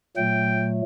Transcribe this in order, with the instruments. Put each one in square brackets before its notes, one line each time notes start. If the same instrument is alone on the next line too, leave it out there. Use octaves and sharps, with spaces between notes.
[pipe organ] A#2 F#3 A3 [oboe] G5